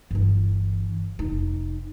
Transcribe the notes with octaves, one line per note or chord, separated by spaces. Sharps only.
G1 E3
F1 D#4